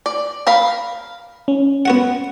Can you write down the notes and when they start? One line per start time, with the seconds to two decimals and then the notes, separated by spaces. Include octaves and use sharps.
0.06 D5
0.47 A#4 F5 B5
1.48 C#4
1.85 B3 F#4 F#5